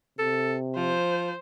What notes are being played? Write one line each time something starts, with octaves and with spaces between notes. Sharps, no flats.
C3 A4
F3 C5